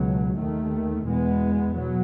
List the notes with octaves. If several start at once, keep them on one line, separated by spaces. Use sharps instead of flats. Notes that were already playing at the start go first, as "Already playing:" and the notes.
Already playing: C#2 B2 F#3
D#2 D#3 A3
E2 B2 G#3 B3
B2 F#3